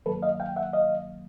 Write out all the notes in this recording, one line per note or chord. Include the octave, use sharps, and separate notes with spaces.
G2 D#3 F#3 A#3 A4 B4
D#5 F5
F5 G5
E5 F#5
D#5 F5